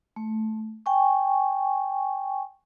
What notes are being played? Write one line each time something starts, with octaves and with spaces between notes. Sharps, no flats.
A3
G5 G#5 C#6